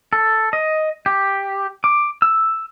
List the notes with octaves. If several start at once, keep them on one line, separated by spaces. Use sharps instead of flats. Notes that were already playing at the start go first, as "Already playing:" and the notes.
A4
D#5
G4
D6
E6